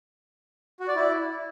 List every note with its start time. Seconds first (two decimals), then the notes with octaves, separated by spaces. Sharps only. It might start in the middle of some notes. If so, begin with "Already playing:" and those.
0.80 F#4
0.88 D5
0.95 E4